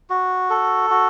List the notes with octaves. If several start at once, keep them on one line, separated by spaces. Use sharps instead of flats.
F#4
A4
F#4